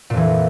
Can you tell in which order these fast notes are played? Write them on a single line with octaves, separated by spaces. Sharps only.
A#2 F2 E3